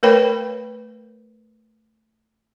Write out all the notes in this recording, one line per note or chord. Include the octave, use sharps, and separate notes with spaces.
A3 A#4 B4 C#5 G5 B5